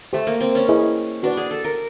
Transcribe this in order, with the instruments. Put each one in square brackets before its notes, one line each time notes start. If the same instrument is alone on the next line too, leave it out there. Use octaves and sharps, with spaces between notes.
[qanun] A3 [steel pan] G4 C5 E5
[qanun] A#3
C4
C#4
[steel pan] E4 G#4 B4 D#5
[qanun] D4 [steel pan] F#4 B4 D5
[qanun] G#4
A4
A#4